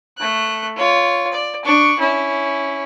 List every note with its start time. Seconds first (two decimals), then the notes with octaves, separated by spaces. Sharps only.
0.18 A3 F#6
0.76 F4 C#5
1.33 D5
1.65 D4 C#6
1.99 C#4 E4